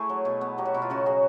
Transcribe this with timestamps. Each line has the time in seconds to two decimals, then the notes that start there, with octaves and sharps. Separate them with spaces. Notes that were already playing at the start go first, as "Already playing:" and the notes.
Already playing: A3 E4 G#4
0.09 F#3
0.25 B2
0.41 B3
0.58 F#3 G4
0.65 F#4
0.74 B2 E4
0.82 F4
0.90 C#3 F#4
1.06 F#3 G#4